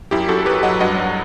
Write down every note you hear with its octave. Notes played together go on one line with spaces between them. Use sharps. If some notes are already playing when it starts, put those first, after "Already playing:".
F#2 E4 G4
F#2 F#4 A4
F#3 G4 B4
F#3 D#5 F#5
G2 D#5 F#5
G2